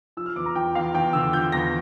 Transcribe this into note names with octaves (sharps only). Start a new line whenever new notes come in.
F3 E6
F6
E2 D6
A#5
F3 G5
E2 F5
E2 G5
D3 E6
F3 G6
E2 A#6